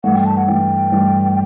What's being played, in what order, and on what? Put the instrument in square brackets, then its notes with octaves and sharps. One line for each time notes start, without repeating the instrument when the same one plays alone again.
[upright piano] G2 E3 A3 [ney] F#5
[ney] G5
A5
F#5
[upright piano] G2 E3 A3 [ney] G5
[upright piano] G2 E3 A3